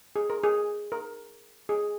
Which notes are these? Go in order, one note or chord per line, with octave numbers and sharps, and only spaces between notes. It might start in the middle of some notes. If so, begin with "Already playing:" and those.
G#4
A#4
G#4
A#4
G#4